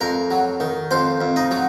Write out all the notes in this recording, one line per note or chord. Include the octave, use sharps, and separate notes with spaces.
F2 A#4
F#3
D#3
F2 C5
F2
D#4
F#3